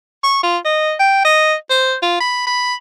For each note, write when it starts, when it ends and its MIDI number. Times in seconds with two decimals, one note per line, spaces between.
0.23 0.41 85
0.43 0.58 65
0.65 0.94 75
0.99 1.21 79
1.25 1.55 75
1.70 1.95 72
2.02 2.16 65
2.20 2.43 83
2.47 2.74 83